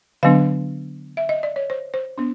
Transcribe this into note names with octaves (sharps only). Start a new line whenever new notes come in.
D3 F#3 B3 D4 F5
E5
D#5
D5
C#5
C5
C5
B3 D4